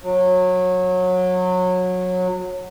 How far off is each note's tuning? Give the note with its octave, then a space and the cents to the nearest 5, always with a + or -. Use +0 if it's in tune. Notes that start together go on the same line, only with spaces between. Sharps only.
F#3 -20